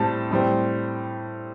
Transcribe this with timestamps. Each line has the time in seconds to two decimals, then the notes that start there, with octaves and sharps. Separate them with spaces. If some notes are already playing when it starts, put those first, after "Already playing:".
Already playing: A2 G3 C4 A5
0.31 A2 G3 C4